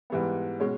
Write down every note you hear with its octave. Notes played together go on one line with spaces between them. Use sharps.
G#2 E3 G3 B3
B2 G#3 C#4